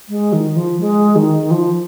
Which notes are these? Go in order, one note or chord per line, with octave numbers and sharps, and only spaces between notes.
G#3
D#3
F3
G#3
D#3
F3